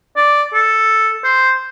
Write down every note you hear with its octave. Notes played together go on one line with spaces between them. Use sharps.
D5
A4
C5